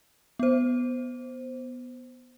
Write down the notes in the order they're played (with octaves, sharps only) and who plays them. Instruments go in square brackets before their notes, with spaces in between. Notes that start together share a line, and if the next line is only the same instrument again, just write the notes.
[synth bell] B3 C5